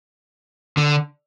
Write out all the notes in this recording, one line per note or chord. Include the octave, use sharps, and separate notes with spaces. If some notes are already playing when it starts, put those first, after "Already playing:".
D3